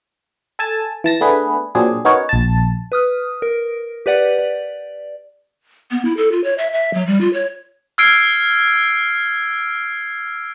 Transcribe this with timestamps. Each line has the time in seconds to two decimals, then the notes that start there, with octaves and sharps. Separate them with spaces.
0.59 A4 G#5 A5
1.04 E3 A5 A#6
1.21 A3 B3 D4 G#4 B4
1.75 A#2 F#3 C4 D4 G#4
2.05 B3 C#4 D#4 F#4 A#4 C#5
2.29 A#1 A5
2.92 B4 D#6 F6
3.42 A#4
4.06 G4 B4 D5 F#5
4.39 D5
5.91 B3
6.05 E4
6.17 A4
6.32 F4
6.44 C#5
6.58 E5
6.73 E5
6.94 F#3
7.07 G3
7.21 F4
7.34 C#5
7.98 E6 F6 G#6 C7 D7